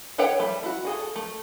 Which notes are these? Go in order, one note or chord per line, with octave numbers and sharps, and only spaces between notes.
A4 B4 C#5 F#5 G5
G3 A3
E4 F#4
F#4 G#4 A4
A3